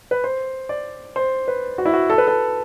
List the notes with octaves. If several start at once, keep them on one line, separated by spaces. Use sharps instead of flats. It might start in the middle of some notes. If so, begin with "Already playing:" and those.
B4
C5
D5
C5
B4
F#4
E4
F#4
A4
B4
A4